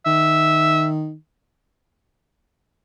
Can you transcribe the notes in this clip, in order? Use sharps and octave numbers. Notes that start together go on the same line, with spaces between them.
D#3 E5